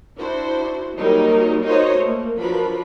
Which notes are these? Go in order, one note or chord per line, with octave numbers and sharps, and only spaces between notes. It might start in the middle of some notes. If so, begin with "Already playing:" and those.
D4 E4 F#4 C5
D#3 F#3 G3 A#3 D#4 A#4
D#4 F#4 A#4 C5 C#5 D#5
A3 A#3
F3 F#3 D4 A#4 B4 B5